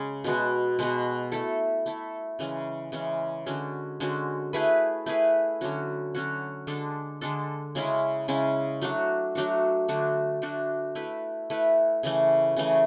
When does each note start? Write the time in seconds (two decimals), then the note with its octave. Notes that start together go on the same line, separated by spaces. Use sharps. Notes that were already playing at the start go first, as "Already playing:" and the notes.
Already playing: C#3 G#3 C#4 G#4
0.24 B2 G#3 B3 F#4
0.79 B2 G#3 B3 F#4
1.32 A3 E4 A4
1.86 A3 E4 A4
2.39 C#3 E3 G#3 C#4
2.92 C#3 E3 G#3 C#4
3.46 D3 G#3 C#4 F#4
4.00 D3 G#3 C#4 F#4
4.53 A3 E4 G#4 B4
5.06 A3 E4 G#4 B4
5.61 D3 F#3 C#4 F#4
6.15 D3 F#3 C#4 F#4
6.67 D3 G#3 D4 A4
7.21 D3 G#3 D4 A4
7.75 C#3 G#3 C#4 E4
8.28 C#3 G#3 C#4 E4
8.82 F#3 A3 D4 F#4
9.35 F#3 A3 D4 F#4
9.88 D3 A3 D4 F#4
10.42 D3 A3 D4 F#4
10.95 A3 E4 B4
11.50 A3 E4 B4
12.03 C#3 E3 A3
12.56 C#3 E3 A3